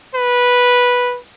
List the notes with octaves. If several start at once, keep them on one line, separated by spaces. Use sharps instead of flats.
B4